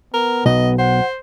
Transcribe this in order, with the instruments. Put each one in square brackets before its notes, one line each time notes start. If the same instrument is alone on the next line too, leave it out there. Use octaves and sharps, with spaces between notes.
[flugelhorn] B3 [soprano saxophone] A#4
[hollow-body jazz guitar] B1 [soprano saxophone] D#5
[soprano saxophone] C5 [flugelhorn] F#5